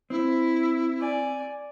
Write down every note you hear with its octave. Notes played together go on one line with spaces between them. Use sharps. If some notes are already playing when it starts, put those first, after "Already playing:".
C4 E4
D5 G#5